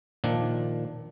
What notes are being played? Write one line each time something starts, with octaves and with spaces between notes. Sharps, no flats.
A#2 D#3 F3 D4